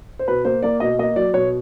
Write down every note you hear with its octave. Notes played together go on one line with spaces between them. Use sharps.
C5
B2 B4
A#3 C5
A#3 D5
B2 D#5
A#3 D#5
F#3 D5
B2 C#5